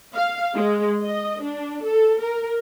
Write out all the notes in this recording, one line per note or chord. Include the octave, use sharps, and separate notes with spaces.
F5
G#3
D#5
D4
A4
A#4